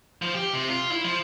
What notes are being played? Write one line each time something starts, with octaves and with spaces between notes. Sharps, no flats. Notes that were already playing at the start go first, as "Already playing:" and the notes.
F3
G4
C3
F4
E4
F3